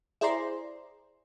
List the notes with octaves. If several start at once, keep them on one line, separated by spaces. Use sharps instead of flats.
E4 G#4 C5 D5 A#5 C6